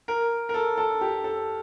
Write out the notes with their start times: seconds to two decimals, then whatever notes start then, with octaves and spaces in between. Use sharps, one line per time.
0.08 A#4
0.49 A#4
0.54 A4
0.77 A4
1.01 G4
1.24 A4